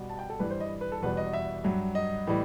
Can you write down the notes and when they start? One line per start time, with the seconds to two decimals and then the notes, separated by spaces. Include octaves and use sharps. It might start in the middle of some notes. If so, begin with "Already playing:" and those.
Already playing: B2 G3
0.10 A5
0.19 G5
0.30 A4
0.40 G2 E3 G3 B4
0.51 C5
0.61 D#5
0.81 B4
0.92 A4
1.02 E2 B2 G3 B4
1.17 D#5
1.33 E5
1.64 G2 F#3
1.95 D#5
2.27 A2 E3 G3